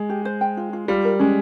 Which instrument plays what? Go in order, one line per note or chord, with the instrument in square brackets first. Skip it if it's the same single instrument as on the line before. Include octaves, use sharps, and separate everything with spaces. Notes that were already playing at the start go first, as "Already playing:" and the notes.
Already playing: [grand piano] G#3
[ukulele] G4
C5
G5
F4
F4
[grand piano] G3 [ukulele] F4
[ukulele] A#4
[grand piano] G#3 [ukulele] C#4